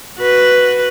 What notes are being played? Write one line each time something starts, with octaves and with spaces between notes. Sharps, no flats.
F#4 B4